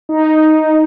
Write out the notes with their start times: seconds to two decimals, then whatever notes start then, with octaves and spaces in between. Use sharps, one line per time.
0.09 D#4